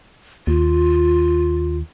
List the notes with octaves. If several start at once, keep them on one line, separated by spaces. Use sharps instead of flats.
D#2 F4